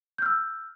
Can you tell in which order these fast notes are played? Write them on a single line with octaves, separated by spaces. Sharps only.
G6 F6 E6